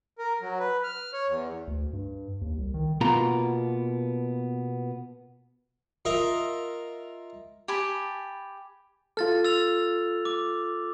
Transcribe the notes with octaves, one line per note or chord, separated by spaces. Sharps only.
A#4
F#3
B4
F6
C#5
E2
D2
G2
D#2
C2
D#3
B2 A#3 B3 F4 A#5 B5
F4 A#4 D#5 E5
G4 G#5 A5 B5
F4 A4 F6 A6
E6 A6 F7
D6